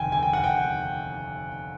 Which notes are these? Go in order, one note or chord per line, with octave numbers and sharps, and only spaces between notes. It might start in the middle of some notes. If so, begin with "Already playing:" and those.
Already playing: F1 D#2 D3 G5 G#5
G#5
G5
F#5
G5